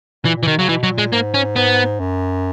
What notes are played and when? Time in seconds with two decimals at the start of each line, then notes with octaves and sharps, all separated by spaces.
0.25 A#2 E3
0.36 A#2
0.43 E3
0.47 B2 D#3
0.58 C#3 F#3
0.69 B2 E3
0.83 F#3
0.91 A#2
0.98 G#3
1.13 G#2 A#3
1.34 C#4
1.56 G#2 B3
2.00 F#2